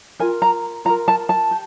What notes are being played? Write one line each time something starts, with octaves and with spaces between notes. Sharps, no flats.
F4 A#4 G#5
A#5
F4 A#4 A#5
A5
A5
G4